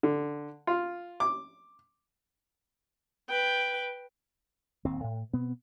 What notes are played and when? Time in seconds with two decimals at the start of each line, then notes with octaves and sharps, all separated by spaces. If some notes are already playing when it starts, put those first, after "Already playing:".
0.03 D3
0.67 F4
1.20 D6
3.29 B4 G5
4.85 D1 D#2 C4
5.04 A2
5.33 B2 B3 C4